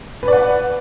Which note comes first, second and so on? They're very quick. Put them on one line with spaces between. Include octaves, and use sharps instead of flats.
B4 D5 F#5